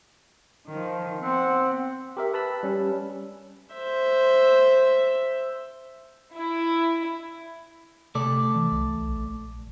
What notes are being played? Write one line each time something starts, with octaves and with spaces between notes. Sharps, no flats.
D#3 F3
B3 C4 F#5
G4 A#4 E5
B4 A5 B5 E6
G3 C#4
C5 E5
E4
C3 A3 A4 D5
E3
C2
A#1